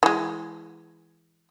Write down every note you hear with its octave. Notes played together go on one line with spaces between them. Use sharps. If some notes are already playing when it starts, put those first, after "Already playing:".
E3 G#3